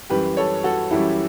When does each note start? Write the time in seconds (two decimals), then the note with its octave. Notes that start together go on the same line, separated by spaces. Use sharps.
0.10 F#2 E3 G3 G4 B4
0.37 A4 C#5
0.64 F#4 A4
0.91 F#2 E3 G3 E4 G4